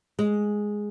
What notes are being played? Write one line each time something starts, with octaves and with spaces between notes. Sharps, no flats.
G#3